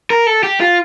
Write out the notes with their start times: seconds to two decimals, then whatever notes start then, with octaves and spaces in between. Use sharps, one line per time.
0.10 A#4
0.27 A4
0.43 G4
0.61 F4